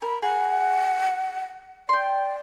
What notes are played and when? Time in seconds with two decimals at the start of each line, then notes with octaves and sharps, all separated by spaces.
0.02 A#4 B5
0.22 G#4 F#5
1.89 D5 G5 C6